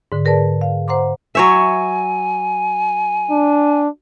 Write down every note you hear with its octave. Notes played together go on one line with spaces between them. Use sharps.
G#2 D3
G#4 A#4 B4 D5 A5
F5
C5 F#5 A#5 C6 D6
F#3 C#5 E5 G#5
D4